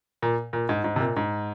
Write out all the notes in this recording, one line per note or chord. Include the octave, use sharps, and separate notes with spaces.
A#2
A#2
G#2
G#2
C3
A#2
G#2